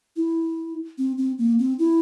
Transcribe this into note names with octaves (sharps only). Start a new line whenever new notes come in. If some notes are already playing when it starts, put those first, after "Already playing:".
E4
C4
C4
A#3
C4
E4